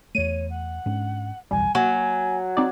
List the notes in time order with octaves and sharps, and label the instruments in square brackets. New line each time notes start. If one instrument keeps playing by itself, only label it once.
[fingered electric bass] E2 A3 [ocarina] C#5 [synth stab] D#7
[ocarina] F#5
[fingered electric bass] G#2 C#4 D4
[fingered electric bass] F#1 B1 E2 [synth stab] G3 [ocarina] G#5
[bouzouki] F#3 [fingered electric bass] A#3 [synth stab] F#4 [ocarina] G#5
[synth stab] C4 D#4 D5